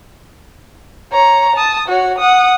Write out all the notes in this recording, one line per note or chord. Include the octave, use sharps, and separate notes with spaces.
C#5 A#5
A5 D#6
F#4 C#5
F#5 D#6